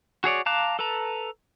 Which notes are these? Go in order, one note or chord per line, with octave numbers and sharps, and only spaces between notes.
F#4 G#4 C#5 D5
F5 A5 A#5 D6 F#6
A4 B4 A5 A#5